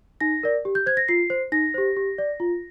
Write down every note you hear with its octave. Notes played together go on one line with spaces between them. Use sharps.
D#4 A#6
A#4 D5
G4
G6
C5 G#6
A#6
F4 C7
C5
D#4 A#6
G4 C5
G4
D5
F4